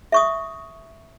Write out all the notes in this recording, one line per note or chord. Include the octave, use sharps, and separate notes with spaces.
E5 C#6 D#6